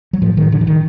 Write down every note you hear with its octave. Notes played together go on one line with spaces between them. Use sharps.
F#3
A2 F3
D#3
D3
E3
D#3